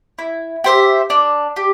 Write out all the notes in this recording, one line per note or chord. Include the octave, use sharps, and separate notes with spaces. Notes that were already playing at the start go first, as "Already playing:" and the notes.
E4
G4 C5 E5
D4
G4